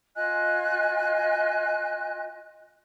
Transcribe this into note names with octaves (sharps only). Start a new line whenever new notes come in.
F4 D#5 G#5 F#6